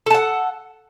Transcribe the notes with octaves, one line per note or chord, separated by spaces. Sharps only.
A4 F#5 A5